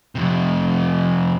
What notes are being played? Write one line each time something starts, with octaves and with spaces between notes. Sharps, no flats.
F2 C3